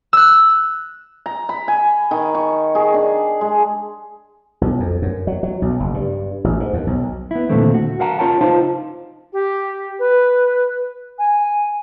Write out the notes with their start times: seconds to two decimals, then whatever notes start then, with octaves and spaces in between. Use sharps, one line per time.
0.13 E6 F#6
1.26 A#5
1.49 B5
1.68 G#5
2.11 D#3
2.35 C#6
2.75 G#4
2.94 D4
3.41 G#3
4.61 B1
4.80 F2
5.02 F#2
5.27 F#3
5.43 F#3
5.62 B1
5.80 F#1
5.94 G2
6.44 A1
6.60 G#2
6.73 D#2
6.87 B1
7.31 B3 E4
7.49 D#2 A#2 D3 E3 A3 C4
7.74 F#4
8.00 A#4 F5 F#5 A5 A#5
8.19 C#4 F4 A#4 C#5 G5 A5
8.41 D#4 F4 C5 F5 A5
9.33 G4
9.99 B4
11.19 G#5